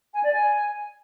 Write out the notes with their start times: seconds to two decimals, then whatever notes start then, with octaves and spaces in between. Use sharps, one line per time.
0.14 G#5
0.24 D5
0.33 G#5